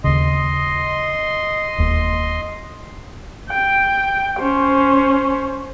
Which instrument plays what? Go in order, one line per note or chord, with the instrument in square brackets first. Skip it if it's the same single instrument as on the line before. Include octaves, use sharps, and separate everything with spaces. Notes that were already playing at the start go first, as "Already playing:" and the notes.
[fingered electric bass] D#2 C#3 [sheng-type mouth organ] D#5 C6
[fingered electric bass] E1 D#2
[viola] G5
C#4 C5